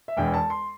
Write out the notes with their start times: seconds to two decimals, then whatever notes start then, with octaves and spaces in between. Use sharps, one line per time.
0.08 E5
0.17 E1 E2 E3 G5
0.34 A5
0.50 C6